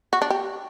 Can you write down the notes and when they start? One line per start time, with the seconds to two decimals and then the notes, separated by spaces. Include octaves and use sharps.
0.13 F#4
0.22 D4
0.30 G4